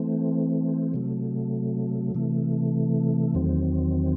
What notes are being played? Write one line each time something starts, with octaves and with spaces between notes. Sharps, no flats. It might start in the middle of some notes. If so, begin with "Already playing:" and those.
Already playing: E3 A3 C4
C3 F#3 A3
C3 E3 A3
E2 D#3 F#3 C4